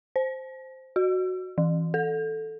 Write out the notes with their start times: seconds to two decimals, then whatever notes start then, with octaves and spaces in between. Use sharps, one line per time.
0.16 C5
0.96 F#4
1.58 E3
1.94 A4